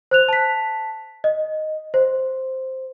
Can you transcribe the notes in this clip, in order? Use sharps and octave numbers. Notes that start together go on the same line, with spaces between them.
C5 F#6 F7
A5 B6
D#5
C5